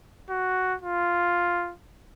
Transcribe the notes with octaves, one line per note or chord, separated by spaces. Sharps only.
F#4
F4